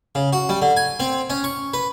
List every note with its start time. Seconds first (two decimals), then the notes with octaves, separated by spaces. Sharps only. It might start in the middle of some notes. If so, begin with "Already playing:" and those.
0.15 C#3
0.33 F#4
0.49 G3
0.62 D3
0.77 G#5
1.00 C4
1.30 C#4
1.44 C#6
1.74 B4